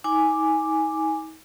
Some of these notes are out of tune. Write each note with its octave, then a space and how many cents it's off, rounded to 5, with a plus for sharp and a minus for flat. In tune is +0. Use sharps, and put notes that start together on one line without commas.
D#4 +40 G#5 +0 D6 +0